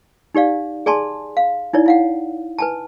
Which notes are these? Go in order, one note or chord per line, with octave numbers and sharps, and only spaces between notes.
D#4 G4 D5 F5
G#4 D5 G#5 A5 C6
F5
D#4 E4 C#5 D5
E4 F5 F#5
B4 G#5 A5